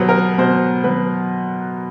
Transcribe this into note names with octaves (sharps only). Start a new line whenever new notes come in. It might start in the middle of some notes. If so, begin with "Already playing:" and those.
Already playing: B2 F#3 B4 C5
A#4
B2 C5
F#3 B4